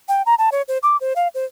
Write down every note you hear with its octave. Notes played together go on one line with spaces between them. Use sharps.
G5
A#5
A5
C#5
C5
D6
C5
F5
C5